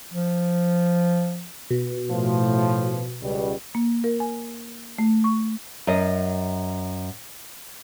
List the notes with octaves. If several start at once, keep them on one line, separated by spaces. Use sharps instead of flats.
F3
B2
A2 F3
C#2 B2 G3
A#3
A#4
G#5
A3
C#6
F#2 D#5